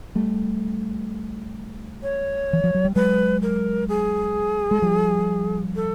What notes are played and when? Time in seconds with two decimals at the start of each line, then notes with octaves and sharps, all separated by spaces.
0.15 G3 A3
2.03 C#5
2.53 E3
2.64 F3
2.74 F#3
2.85 G3
2.95 F#3 G#3 B4
3.42 A#4
3.89 G#4
4.71 G#3
4.82 F3 G3
5.75 A4